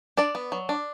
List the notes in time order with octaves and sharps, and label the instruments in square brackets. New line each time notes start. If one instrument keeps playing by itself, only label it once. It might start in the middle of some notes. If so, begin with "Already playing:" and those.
[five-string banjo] D4 D5
B3
F#3
D4